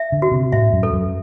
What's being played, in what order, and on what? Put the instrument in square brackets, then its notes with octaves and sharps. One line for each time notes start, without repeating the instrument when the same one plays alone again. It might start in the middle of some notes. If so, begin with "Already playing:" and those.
Already playing: [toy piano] E5
[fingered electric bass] D3
[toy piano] F#4
[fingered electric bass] C3
[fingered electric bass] A2 [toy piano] E5
[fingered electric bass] F#2
[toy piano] A4
[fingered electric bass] F#2